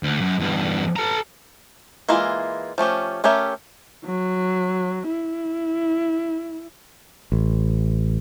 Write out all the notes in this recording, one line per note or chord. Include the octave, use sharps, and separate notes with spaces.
D2
F#2
E2 G2
A4 A#5
E3 G#3 A#3 E4 F4
F3 A3 C#4 G4
A3 C#4 G4 A#4 E5
F#3
E4
A1